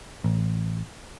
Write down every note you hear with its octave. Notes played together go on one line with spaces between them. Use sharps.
A1